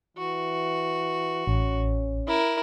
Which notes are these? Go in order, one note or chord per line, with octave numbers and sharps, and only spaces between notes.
E3 F#4
A1 C#4
E4 A#4